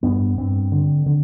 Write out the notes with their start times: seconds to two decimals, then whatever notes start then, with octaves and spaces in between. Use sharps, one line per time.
0.03 G2 B3
0.38 G2 C4
0.72 D3
1.06 D3